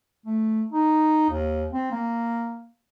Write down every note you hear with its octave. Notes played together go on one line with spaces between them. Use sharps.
A3
D#4
D#2
C4
A#3